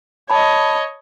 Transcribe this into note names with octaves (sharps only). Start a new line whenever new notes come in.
C#5 D#5 A5 B5